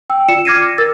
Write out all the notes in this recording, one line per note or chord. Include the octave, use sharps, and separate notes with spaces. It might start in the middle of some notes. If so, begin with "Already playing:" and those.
G5 E6
F4 D5 C#7 E7
D6 F6 G#6 A#6 C7 D#7
A#4 E6 A6